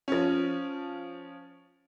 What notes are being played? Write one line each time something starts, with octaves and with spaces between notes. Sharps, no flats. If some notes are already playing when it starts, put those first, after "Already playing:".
F3 C#4